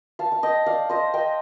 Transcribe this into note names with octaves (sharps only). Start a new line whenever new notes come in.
F5 A5
F5
D#5 G5
D5 F5
C5 D#5
D#5 G5